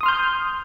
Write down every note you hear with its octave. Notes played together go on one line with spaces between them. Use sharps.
C6 D#6 F6 G6